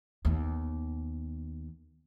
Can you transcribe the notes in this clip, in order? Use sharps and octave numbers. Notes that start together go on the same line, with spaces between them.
D#2 B3